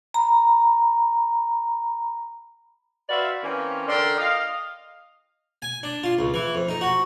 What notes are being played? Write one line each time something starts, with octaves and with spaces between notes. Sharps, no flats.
A#5 B5
F#4 B4 C5 D5 E5 F5
E3 A#3 C4 C#4
D3 D4 A#4 D5 G5 C6
D#5 F5
G#5
D4
F4
C#2
E3
F2
D#4
F#4